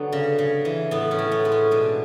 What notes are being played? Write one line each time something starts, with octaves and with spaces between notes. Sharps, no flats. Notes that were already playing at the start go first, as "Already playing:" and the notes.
Already playing: D3 F#3 B3
C#3
C#3
E3
A2 B3
C#4
A2
B3
G#3
C#4
B2 D4